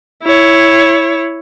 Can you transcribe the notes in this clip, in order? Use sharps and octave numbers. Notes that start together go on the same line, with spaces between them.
E4 C#5